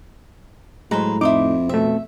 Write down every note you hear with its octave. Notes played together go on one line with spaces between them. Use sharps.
A2 F#3 G#3 B4 C5 A#5
F2 D#4 E4 C6 D6
B2 A3 C4 E5